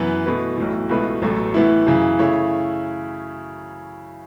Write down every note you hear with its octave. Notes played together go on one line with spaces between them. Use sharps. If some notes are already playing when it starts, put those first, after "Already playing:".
Already playing: F#2 E3 B3
B2 A3 E4 B4
B1 A2 E3
C#2 B2 A3 E4 B4
A1 A2 F#3 A3
A2 E3 B3 E4
F#2 C#3 E3
C#3 A3 E4 C#5